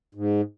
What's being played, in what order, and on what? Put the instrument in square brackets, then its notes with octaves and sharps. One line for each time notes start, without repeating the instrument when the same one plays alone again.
[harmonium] G#2